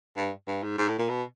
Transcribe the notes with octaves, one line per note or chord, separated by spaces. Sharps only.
G2
G2
G#2
G#2
A2
A#2
B2